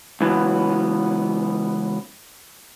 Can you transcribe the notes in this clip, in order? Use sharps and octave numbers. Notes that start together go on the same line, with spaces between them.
C#2 E3 F#3 B3